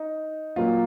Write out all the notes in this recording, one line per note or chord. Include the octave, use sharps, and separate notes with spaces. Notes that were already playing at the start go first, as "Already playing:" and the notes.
Already playing: D#4
A#2 F#3 A#3 F4